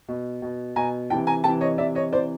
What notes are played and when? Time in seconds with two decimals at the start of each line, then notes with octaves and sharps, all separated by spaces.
0.08 B2
0.42 B2
0.76 B2 G#5 A#5
1.10 E3 G5 A5
1.14 C3
1.27 G#5 A#5
1.44 C3 E3 G5 A5
1.61 C#5 D#5
1.78 C3 E3 D5 E5
1.95 C#5 D#5
2.12 C3 E3 C5 D5